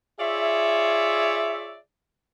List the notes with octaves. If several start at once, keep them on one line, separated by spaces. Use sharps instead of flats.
F4 G#4 C#5 D5 E5